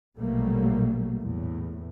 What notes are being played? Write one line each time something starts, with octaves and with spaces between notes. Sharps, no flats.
A#1 B2 F#3 G3 A3 A#3
E2 A2